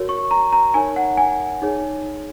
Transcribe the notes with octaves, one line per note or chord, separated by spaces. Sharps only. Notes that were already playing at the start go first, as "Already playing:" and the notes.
Already playing: F#4 A#4 C#5
C#6
A#5
A#5
D#4 A#4 C#5 G#5
F#5
G#5
D#4 G#4 C#5